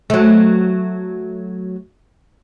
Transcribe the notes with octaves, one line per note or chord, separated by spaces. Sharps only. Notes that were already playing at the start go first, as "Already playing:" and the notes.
F#3 A3